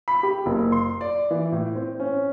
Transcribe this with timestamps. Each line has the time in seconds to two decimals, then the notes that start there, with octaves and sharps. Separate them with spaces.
0.08 B5
0.23 G4
0.46 F#1
0.72 C6
1.01 D5
1.31 E3
1.52 A2
1.76 C4
2.00 C#4